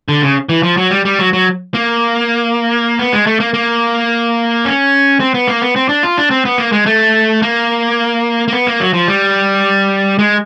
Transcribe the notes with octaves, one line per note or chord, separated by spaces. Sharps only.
D3
C#3
E3
F3
F#3
G3
G3
F#3
F#3
A#3
B3
G#3
A3
A#3
A#3
C#4
C4
B3
A#3
B3
C4
D4
F4
D4
C4
B3
A#3
G#3
A3
A#3
A#3
B3
A#3
F#3
F3
G3
G#3